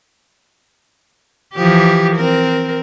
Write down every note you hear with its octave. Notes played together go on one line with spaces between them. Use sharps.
E3 F3 G4
C4 A#4